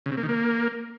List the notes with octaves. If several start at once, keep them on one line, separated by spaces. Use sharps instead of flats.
C#3
C3
A#3
D#3
A#3